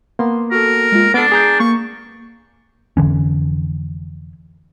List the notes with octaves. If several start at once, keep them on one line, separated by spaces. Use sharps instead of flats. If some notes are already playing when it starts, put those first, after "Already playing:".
A#3 B3 C6
F#4 A4 A#4
G#3 F4
B3 D4 A4 C7 D7
G#4 A#5 G6
A#3 C#6
F1 D3 E3 C#4